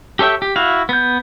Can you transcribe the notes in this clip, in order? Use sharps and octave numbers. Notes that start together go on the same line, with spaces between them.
G4 A4 C#5 E5 G5
G4
E4 F#4 F5
B3 G6